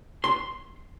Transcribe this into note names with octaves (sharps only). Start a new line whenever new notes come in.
C6